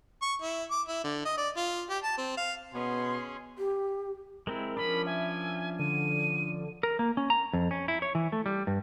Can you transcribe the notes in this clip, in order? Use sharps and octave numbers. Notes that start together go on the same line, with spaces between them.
C#6
E4
D6
E4
D3
D#5
D5
F4
G4
A5
C4
F5
B2 B3 C#4 G#4 C6
G4
G#3 C4 E4 A#4
F3 C#4 D4 B5
E5 G#5
D3 D#7
A#4
A#3
C#4
A#5
F2
C#4
E4
C#5
E3
A3
G3
G2